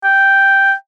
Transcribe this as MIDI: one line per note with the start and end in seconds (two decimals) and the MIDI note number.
0.04 0.74 79